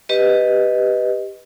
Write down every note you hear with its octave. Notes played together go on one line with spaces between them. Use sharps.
G4 B4 D#5